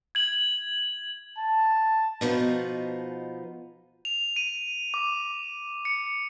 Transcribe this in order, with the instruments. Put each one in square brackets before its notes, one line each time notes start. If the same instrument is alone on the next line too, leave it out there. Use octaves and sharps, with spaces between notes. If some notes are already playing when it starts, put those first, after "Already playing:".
[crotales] G#6 F#7
[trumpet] A5
[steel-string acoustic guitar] B2 F3 B3 D#4
[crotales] F7
D#7
D6
C#7